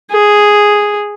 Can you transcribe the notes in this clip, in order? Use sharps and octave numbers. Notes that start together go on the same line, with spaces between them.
G#4